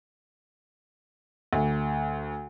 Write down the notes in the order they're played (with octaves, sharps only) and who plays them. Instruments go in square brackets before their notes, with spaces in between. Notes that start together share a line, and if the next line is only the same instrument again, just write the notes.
[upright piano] D2